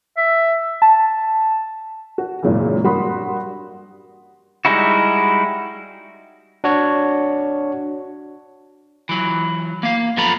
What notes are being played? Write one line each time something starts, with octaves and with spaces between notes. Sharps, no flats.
E5
A5
F#4
G#1 F#2 A#2 C#3 E3
G2 F#4 A#4 B5 C6 D#6
G3 G#3 D#4 E4 F#4
D4 F#4 C#5
E3 F#3
A#3 F5
F#2 F3 B3 A4 A#5 B5